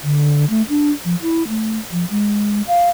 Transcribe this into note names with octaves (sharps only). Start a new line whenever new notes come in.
D3
A3
D4
F3
E4
A3
F3
G#3
F5